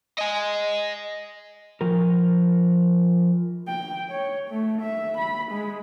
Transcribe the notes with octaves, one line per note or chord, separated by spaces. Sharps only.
D#5 G#5
F3 A#4
G5
C#5
A3
E5
B5
G#3